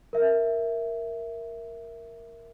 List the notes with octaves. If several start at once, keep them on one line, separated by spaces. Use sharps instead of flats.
A#4 E5